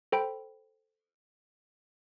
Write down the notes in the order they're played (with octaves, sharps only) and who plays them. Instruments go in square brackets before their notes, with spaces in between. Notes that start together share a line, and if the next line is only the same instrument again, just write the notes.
[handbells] A4 C5 G5 B5 D7